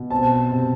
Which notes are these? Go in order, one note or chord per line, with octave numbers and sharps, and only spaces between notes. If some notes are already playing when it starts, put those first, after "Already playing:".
Already playing: B2
C4 A5
C3